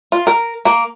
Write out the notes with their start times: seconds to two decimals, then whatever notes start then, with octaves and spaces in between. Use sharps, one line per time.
0.12 F4
0.27 A#4
0.65 A#3